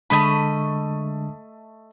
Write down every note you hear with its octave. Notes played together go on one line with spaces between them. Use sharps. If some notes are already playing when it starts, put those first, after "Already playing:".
D3 G#3 A3 D4 D#5 B5